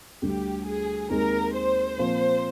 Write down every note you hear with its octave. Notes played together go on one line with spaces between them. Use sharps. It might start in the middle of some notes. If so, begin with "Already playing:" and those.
D2 D3 G3 G4
G#4
D#2 D#3 G#3 C4 A#4
C5
A#2 F3 C4 F4